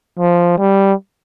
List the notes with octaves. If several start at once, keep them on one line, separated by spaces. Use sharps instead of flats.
F3
G3